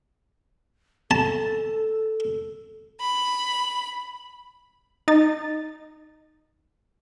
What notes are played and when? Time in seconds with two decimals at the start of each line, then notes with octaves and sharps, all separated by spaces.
1.11 A4 A5
3.01 B5
5.08 D#4 A6